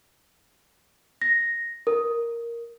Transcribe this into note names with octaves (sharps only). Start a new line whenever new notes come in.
A#6
A#4